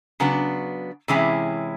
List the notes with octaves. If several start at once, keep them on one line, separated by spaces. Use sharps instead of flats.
C#3 F#3 B3 D4
C3 E3 G#3 C#4 E4